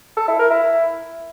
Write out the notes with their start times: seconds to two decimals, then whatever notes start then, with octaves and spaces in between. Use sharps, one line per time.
0.17 A4
0.28 E4
0.39 A#4
0.50 E4